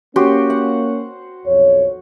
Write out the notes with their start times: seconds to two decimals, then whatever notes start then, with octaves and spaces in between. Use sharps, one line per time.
0.16 A#3 C#4 F#4 G4 C5
0.50 F#5
1.46 B1 F2 C#5